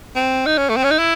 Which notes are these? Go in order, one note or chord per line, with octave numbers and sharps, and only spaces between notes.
C4
D#4
C#4
A3
C4
C#4
D#4
E4